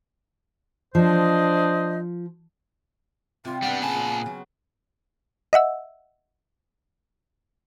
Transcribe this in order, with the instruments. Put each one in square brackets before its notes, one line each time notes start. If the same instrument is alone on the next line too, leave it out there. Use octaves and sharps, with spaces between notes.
[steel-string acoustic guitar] F3 [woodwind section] D4 C5 D#5
[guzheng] C3 G3 [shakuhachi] F4
[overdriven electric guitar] G3 D4 [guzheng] B3 F4 F5 [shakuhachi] F#5
[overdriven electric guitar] A#2 A5 [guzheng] C#3 B4 [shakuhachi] G#5
[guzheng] F4
F#3
[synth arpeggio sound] D#5 E5 F#5 E6